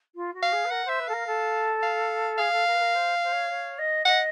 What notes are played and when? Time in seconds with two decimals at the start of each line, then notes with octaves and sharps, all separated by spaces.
0.15 F4
0.33 F#4
0.43 F5
0.52 G#4
0.64 B4
0.71 A#4 F#5
0.85 C5 E5
0.99 B4
1.08 A4 A#4 F5
1.26 A4
1.82 F5
2.38 G#4 F5
2.52 A4
2.66 A#4
2.74 B4
2.80 A#4
2.94 C5
3.23 C5
3.32 C#5
3.49 C#5
3.78 D#5
4.05 D#5 F#5